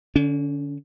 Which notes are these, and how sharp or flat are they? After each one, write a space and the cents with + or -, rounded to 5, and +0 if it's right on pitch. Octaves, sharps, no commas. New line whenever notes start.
D3 +0 C#4 +35